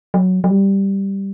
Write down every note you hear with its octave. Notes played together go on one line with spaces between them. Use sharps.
F#3
F#3
G3